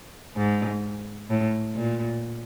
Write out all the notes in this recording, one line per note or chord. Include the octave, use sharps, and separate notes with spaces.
G#2
A2
A#2